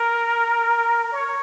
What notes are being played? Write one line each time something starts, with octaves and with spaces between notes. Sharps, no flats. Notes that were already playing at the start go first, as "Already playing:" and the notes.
Already playing: A#4
C#5